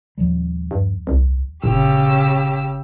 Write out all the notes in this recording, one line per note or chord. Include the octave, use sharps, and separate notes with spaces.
D#1 F3 G3
G2
C2
G1 A#2 C#3 G4 E6